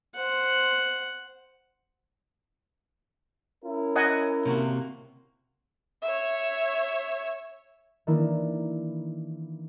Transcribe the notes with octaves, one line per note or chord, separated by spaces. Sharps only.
C5 F#5
C#4 E4 A#4
D#5 F#5 G#5
C3 A#3 F#4
C#5 E5
D#3 E3 A#3 D4 E4 A#4